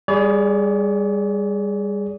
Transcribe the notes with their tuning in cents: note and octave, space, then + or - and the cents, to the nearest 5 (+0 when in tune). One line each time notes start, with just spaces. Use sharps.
G3 +25 G#4 +0 D5 -45